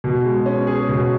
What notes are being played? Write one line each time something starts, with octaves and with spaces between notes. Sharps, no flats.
B2
G#3
C#4
G#4
B2